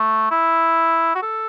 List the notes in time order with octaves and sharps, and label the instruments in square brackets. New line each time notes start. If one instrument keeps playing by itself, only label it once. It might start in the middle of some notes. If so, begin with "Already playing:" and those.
Already playing: [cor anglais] A3
E4
F#4
A4